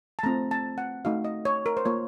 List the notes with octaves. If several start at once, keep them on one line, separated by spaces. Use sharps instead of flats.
A5
A3 C4 F4 A#5
A5
F#5
A3 D#4 F#4 F5
D#5
C#5
A#4
C5
A#3 F4 C#5